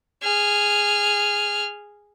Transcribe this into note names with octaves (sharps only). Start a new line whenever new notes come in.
G#4 F6